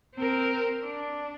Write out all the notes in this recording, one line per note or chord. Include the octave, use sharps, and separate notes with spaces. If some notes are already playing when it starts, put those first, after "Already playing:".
C4 A#4
D4